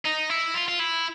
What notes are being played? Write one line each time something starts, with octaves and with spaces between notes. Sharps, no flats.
D#4
E4
F4
F4
E4